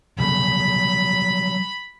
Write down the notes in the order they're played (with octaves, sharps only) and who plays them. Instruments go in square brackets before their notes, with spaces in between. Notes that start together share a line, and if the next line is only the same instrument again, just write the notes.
[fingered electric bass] C#3 F#3 G3 [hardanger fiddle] B5